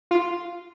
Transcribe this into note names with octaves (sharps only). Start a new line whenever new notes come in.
F4